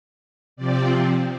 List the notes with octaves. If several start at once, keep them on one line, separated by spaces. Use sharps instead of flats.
C3 F3 C4 D5